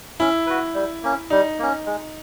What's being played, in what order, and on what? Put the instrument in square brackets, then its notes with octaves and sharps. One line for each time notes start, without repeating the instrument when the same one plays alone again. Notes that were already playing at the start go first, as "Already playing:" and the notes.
[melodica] C#4 [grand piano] E4
[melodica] F#4 B4
G3
A#3 C#4
[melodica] G3 [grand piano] D#4
[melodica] A#3 C#4
G#3